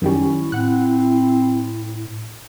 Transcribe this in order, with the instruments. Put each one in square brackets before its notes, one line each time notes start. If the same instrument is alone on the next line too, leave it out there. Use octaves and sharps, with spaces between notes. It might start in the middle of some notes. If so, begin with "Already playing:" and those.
[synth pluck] F#2 D#3 G3 [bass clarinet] C#4 [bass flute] E4
[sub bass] A2 [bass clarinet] C4 [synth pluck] F#5 F#6